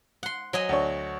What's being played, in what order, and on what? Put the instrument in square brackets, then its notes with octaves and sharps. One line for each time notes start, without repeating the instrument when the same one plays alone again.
[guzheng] F#5 C6
F#3 D#5 G#5
[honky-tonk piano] D2 D4 C#5